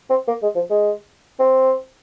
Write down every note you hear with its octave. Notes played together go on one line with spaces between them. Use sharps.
C4
A#3
G#3
F3
G#3
C4